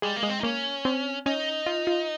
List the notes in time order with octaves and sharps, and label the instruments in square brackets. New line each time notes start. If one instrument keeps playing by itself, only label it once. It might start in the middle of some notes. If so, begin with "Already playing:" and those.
[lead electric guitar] G3 [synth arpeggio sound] G#3
[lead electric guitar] A#3
[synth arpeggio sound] G#3
[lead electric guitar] C4
D#4
[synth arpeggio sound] A#3 [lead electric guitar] C#4
[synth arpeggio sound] C4
[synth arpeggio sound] C#4 [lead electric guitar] D#4
[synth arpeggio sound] F4
F4